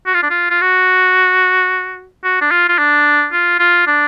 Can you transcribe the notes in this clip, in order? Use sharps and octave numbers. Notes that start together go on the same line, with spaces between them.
F#4
F4
D4
F4
F4
F#4
F#4
D4
F4
F4
D4
F4
F4
D4